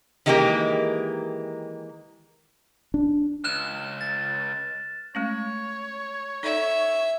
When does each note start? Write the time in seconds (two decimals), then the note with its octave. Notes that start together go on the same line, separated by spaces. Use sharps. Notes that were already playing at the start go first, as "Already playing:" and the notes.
0.26 D#3 E3 G#3 A#3 G4 A#4
2.94 D4
3.44 C#2 F6 F#6 E7
4.01 A6
5.15 G#3 A3 C#4 C#5
6.43 D#4 A4 D5 E5